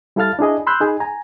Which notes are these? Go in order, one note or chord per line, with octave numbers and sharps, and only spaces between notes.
G3 E4 A4 F5 F6 A6
D4 E4 G#4 D#5
B5 C6 E6 F#6 G6
D#4 G#4
G#5 A#5